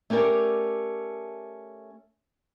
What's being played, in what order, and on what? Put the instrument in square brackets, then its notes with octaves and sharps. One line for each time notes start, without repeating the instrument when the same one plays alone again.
[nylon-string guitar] A3 C#4 G4 A#4 D5